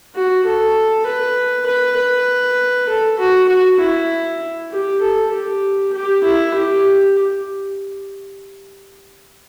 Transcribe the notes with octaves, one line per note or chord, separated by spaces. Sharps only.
F#4
A4
B4
B4
B4
A4
F#4
F#4
E4
G4
A4
G4
G4
E4
G4